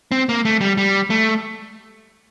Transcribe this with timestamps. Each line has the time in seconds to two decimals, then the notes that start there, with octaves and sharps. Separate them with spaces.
0.12 C4
0.29 A#3
0.45 A3
0.61 G3
0.77 G3
1.10 A3